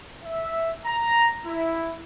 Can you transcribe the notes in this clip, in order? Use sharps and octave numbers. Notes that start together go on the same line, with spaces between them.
E5
A#5
E4